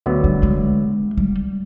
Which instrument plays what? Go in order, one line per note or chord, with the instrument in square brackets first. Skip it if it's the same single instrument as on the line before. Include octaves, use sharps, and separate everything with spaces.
[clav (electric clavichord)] D2 D3 F#3 B3
[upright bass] G3
G#3
G3